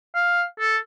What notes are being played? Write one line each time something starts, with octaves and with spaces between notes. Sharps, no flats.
F5
A4